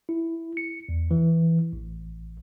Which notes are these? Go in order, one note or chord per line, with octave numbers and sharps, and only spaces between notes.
E4
C#7
E2
E3
A1